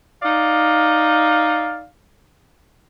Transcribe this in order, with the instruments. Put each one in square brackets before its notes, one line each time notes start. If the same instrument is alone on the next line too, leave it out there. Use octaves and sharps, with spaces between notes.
[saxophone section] D#4 D5 F5